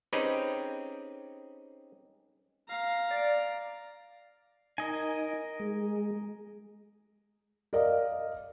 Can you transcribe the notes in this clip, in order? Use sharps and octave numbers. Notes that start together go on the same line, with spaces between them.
C4 C#4 D#4 G4 G#4 B4
F5 A#5
D5
D#4 A#4 D#5 G#5
G#3
A#4 D5 D#5 F5